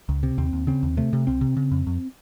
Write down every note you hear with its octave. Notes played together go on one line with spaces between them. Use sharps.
C#2
C3
D#2 C4
D#2
C#3 C4
D#2
C3 A3
C3
C2 C4
C3
C#3
F2
F2